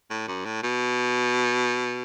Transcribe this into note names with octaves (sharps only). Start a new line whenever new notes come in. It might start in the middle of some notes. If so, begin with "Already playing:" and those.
A2
F#2
A2
B2